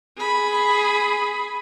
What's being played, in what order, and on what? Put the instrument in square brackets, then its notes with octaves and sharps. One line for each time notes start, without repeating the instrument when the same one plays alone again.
[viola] G#4 B5